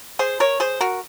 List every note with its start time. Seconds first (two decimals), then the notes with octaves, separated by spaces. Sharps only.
0.19 G#4 C5
0.40 A#4 C#5
0.60 G#4 C5
0.81 F#4 A#4